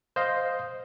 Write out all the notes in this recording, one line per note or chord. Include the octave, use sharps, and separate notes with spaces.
C5 D#5 F5